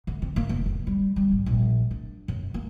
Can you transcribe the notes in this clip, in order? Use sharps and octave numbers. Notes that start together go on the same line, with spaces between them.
D3
C4
A#3
F1
F2
G3
G3
G#1
A#1
D4
F#2
A#3